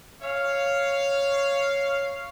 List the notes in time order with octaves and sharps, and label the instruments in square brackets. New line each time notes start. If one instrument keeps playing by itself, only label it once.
[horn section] C#5 F5